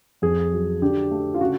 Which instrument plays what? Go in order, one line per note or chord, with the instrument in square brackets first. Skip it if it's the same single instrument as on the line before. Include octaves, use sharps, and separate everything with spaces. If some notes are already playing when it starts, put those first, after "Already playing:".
[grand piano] F2 G#4
F#3
D3 G4
A3
F4
C#3 F#4